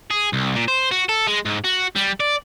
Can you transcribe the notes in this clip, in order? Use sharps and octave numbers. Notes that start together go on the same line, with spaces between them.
G#4
C2
A#2
C5
F#4
A4
G#3
G#2
F#4
G3
D5